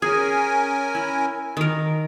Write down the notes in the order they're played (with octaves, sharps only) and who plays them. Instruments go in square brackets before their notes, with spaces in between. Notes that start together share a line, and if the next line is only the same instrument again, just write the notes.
[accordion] C#4 A#4 G#5 [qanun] G#4
[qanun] E4
D#3 A#4